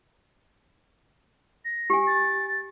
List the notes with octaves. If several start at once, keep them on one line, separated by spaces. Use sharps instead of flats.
A#6
G4 G#5
A6